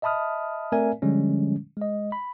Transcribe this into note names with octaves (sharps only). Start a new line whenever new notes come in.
D#5 E5 A5 B5 D#6 F6
A3 C4 A#4 D5 E5 G#5
D3 F3 G3 G#3 C#4
G#3 D#5
B5